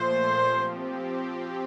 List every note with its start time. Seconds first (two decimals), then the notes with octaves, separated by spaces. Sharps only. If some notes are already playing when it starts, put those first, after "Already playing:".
Already playing: A#2 F3 A3 C5
0.45 F3 C4 G4